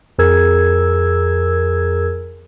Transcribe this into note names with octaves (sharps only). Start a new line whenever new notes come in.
F2 G#4 A#4 E6 G#6